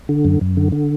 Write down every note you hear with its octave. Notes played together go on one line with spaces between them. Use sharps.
D3
F#2
F#2
D3
D3